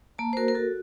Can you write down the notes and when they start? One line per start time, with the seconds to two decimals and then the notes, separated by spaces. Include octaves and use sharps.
0.18 A#3 A5
0.33 C5
0.37 F#4 A#4
0.48 A#4
0.55 F#4 A4